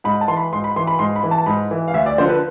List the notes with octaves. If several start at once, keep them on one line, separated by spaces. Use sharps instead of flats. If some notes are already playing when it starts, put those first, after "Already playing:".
G#2 B5
A5
E3 C6
B5
G#2 C6
B5
E3 C6
B5
G#2 C6
B5
E3
A5
G#2 B5
E3
F5
D2 E5
D5
D3 F3 C5
B4